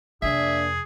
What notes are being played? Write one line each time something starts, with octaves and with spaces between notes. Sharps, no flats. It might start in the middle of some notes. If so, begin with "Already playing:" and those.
F2 C3 A#3 D4 G#4 E5